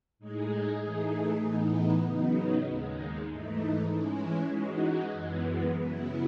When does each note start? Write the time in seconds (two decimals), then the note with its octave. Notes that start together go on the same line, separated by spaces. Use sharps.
0.19 A2 G#3 D#4 G#4
0.81 E3 A3 D#4 G#4
1.43 A2 E3 B3 D#4
2.04 C#3 F#3 B3 D#4
2.66 D#2 D#3 G#3
3.28 G#2 E3 A3 D#4
3.90 E3 G#3 C#4 E4
4.52 E3 G#3 D#4 F#4
5.13 F#2 E3 G#3 B3
5.74 C#3 F#3 B3 E4